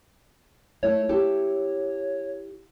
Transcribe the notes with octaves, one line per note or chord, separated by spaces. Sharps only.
A3 E4 C#5
E4 G4 A4